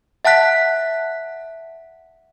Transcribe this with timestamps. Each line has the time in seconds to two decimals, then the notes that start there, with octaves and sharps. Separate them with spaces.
0.25 E5 F#5 A5 F#6 B6